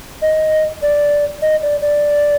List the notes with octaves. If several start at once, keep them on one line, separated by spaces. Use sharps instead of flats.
D#5
D5
D#5
D5
D5